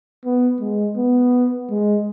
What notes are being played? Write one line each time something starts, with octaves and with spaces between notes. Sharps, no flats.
B3
G#3
B3
G#3